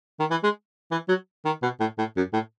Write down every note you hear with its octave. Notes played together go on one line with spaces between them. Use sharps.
D#3
E3
G#3
E3
F#3
D#3
B2
A2
A2
F#2
A2